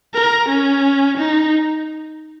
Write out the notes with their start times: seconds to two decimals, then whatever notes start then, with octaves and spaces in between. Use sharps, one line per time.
0.14 A#4
0.49 C#4
1.17 D#4